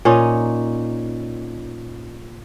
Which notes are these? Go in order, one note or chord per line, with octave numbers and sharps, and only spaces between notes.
A#2 C#4 D#4